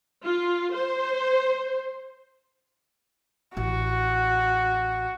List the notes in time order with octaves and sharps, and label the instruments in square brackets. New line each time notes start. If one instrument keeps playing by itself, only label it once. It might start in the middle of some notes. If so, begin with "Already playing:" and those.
[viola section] F4
C5
[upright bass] A1 [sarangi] F#4